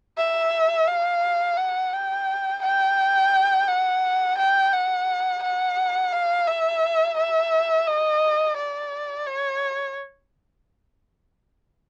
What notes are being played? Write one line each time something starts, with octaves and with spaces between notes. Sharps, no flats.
E5
F5
F#5
G5
G5
F#5
G5
F#5
F#5
F5
E5
E5
D#5
D5
C#5